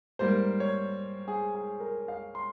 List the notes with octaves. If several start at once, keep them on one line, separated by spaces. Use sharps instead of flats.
G#2 G3 A#3 C5
C#5
G#4
G#4
A#4
F5
C6